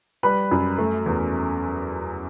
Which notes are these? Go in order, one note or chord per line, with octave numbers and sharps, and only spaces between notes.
G3 B4 B5
F#2
A3
E2